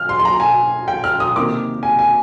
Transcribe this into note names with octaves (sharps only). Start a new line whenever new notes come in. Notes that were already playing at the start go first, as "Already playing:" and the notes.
Already playing: F6
C6
C6
A#5
G#5
G5
F6
D#6
C3 D#3 A#3 D6
G#5
G#5